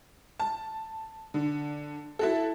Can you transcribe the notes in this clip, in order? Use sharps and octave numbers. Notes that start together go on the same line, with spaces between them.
A5
D3
E4 F#4 A4